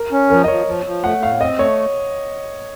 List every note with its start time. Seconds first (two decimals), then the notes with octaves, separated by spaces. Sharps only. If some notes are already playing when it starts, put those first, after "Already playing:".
Already playing: A#4
0.12 C#4
0.30 F3 A#4
0.44 D#5
0.48 F3 C#5
0.67 F3
0.86 F3
1.04 A3 F#5
1.22 A2 F5
1.40 C4 D#5
1.58 A3 C#5